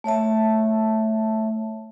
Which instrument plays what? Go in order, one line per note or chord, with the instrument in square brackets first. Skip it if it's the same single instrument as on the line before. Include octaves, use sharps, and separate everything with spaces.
[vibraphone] A3 C#5 E5 A5